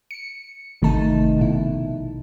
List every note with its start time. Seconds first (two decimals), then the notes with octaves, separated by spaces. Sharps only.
0.11 C#7
0.82 G#1 C3 D#3 A3 D#4 A5
1.37 A#1 B2 E4